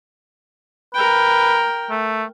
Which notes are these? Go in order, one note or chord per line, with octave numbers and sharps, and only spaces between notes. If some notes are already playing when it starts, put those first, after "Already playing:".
A#4 B4 G5
A3